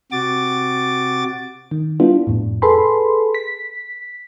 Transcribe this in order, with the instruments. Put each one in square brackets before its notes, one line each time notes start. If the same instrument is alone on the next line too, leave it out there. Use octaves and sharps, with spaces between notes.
[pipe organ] C3 F#4 D6 A6
[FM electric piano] D#3
G3 B3 D4 E4 F4
F2 A2
G#4 A4 B4 B5 C6
B6